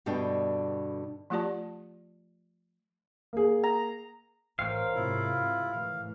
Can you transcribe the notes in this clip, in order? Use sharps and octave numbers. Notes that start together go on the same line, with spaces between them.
G2 B2 D3 D4 D#5 G5
F3 A3 F4 G4 D5 A5
A#3 G#4
A#5
A1 A#4 C5 C#5 F5 G5
G#2 C3 E4 F4
A2 E3 F5